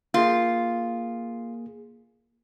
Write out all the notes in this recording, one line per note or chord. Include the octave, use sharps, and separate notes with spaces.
A#3 F4 G#4